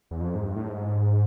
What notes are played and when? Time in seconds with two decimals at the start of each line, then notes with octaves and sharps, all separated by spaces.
0.11 E2
0.20 F2
0.35 G#2
0.44 G2
0.56 A2
0.69 G#2